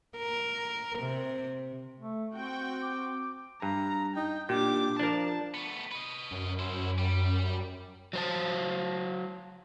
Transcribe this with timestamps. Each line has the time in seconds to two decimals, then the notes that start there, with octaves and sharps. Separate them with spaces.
0.18 A#4
0.99 C3
2.00 A3
2.35 C4 F#4 G5
2.82 D6
3.62 G2 A#5
4.16 D#4 G5
4.49 A#2 D4 G4 D6
4.99 F3 D4 A#4 A5
5.54 A3 B3
5.91 B4 D#5
6.31 F#2
6.59 E4 C5
6.98 G3
8.13 F#3 C5 A5